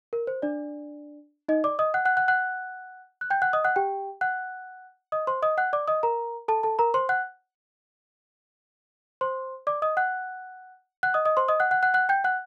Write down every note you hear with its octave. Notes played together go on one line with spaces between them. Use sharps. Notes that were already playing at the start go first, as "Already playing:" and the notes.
A#4
C5
D4 D5
D#4 D#5
D5 D6
D#5 D#6
F#5 F#6
F#5 F#6
F#5 F#6
F#5 F#6
F#6
G5 G6
F#5 F#6
D#5 D#6
F#5 F#6
G4 G5
F#5 F#6
D#5 D#6
C5 C6
D#5 D#6
F#5 F#6
D5 D6
D#5 D#6
A#4 A#5
A4 A5
A4 A5
A#4 A#5
C5 C6
F#5 F#6
C5 C6
D5 D6
D#5 D#6
F#5 F#6
F#5 F#6
D#5 D#6
D#5 D#6
C5 C6
D#5 D#6
F#5 F#6
F#5 F#6
F#5 F#6
F#5 F#6
G5 G6
F#5 F#6